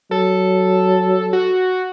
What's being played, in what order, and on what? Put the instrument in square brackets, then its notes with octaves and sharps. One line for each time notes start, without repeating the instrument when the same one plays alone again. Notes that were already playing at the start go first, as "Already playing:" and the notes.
[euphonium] F#3 [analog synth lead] A4
[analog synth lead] F#4